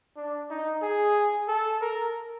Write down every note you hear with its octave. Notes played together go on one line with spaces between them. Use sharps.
D4
D#4
G#4
A4
A#4